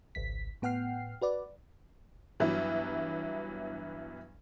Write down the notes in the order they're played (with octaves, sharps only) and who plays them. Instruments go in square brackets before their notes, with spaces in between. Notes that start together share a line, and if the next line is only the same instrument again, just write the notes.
[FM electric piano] G#1 C#2 B6
A2 B3 F#5 G5 F6 C7
F#4 B4 D5
[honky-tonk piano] G2 E3 F#3 B3 E4